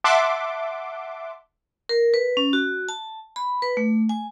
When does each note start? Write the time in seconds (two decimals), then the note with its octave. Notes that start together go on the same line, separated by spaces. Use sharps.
0.04 E5 F#5 A5 C6 D6
1.89 A#4
2.14 B4
2.37 C#4
2.53 F#4
2.89 A5
3.36 B5
3.62 B4
3.77 A3
4.09 G#5